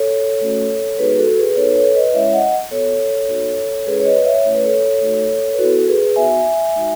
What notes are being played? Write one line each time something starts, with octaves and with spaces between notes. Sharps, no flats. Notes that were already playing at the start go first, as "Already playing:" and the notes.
Already playing: A4 C#5
A3 C#4 F#4
G#3 B3 D#4 F#4 G#4 B4
F#4 A4
G#4 B4
B4
B3 D#4 F#4 A4 C#5
B4
A4 C#5
B4 D#5
G#3 C#4 E4 C#5 E5
D#5 F#5
B3 F#4 A4 C#5
B3 D#4 F#4
G#3 C#4 E4 G#4 B4
C#5
B4 D#5
C#5 E5
A3 C#4 E4 C#5
B4
A4 C#5
A3 D#4 F#4
B4
B3 E4 F#4 A4
G#4 B4
B3 D#4 F#4 E5 G#5
G#3 D#4 F#4